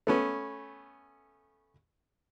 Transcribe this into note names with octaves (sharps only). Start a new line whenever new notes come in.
A3 B3 C#4